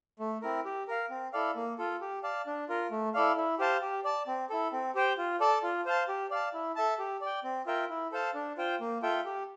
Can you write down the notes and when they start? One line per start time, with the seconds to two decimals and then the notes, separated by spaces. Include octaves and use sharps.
0.19 A3
0.42 C4 E4 A#4
0.65 G4
0.88 A#4 F5
1.10 C4
1.33 E4 A4 D5 F5
1.55 A#3
1.78 F4 A4
2.01 G4
2.23 D5 F5 A5
2.46 D4
2.69 F4 A#4
2.91 A3
3.14 E4 A4 D5 F5
3.37 E4
3.59 G4 C5 F5 A5
3.82 G4
4.05 D5 A5
4.27 C4
4.50 E4 A4
4.73 C4
4.95 G4 C5 G5
5.18 F4
5.40 A4 D5 A5
5.63 F4
5.86 C5 F5 A5
6.08 G4
6.31 D5 F5 A5
6.53 E4
6.76 A4 E5 A5
6.99 G4
7.21 D5 G5
7.44 C4
7.66 F4 A#4 E5 G5
7.89 E4
8.12 A4 C5 F5 A5
8.34 D4
8.57 F4 C5 G5
8.80 A#3
9.02 F4 A4 E5 G5
9.25 G4